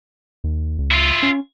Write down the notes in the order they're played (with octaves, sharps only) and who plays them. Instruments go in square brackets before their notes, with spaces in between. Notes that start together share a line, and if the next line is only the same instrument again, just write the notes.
[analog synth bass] D#2
C#2
[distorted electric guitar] E4 F4
[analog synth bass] C#4